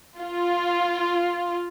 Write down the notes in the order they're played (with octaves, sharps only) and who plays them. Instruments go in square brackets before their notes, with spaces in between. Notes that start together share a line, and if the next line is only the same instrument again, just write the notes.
[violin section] F4